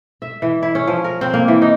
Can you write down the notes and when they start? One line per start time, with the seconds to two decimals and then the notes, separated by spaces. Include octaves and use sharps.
0.22 E5
0.42 E3
0.63 E4
0.75 C#4
0.87 F3
1.04 A#4
1.21 C4
1.34 A#3
1.48 E3
1.62 D#4